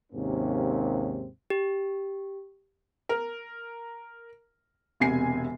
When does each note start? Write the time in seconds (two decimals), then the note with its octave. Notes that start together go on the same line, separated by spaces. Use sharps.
0.13 D#2 G#2 C3 A#3 C4 C#4
1.50 G4
3.09 A#4
5.00 E1 C3 G#5 C7